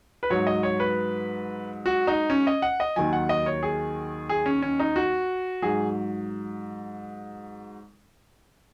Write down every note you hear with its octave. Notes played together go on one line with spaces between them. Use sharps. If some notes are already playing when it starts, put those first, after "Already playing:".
B4
G#2 F#3 C#5
D#5
C#5
B4
F#4
D#4
C#4
D#5
F#5
D#5
D#2 D#3 F#3 G#5
F#5
D#5
C#5
G#4
G#4
C#4
C#4
D#4
F#4
G#2 F#3 G#4